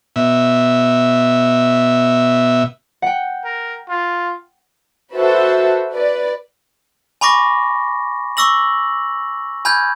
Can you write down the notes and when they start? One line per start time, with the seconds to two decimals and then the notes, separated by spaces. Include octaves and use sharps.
0.16 B2 E5
3.02 F#5 G5
3.45 A#4
3.89 F4
5.14 F#4 A4 B4 C5 E5 F#5
5.92 B4 D5
7.21 G#5 B5 C#6 D6 A#6
8.37 C#6 D6 E6 A#6 F#7
9.65 G#5 B5 F6 G6 G#6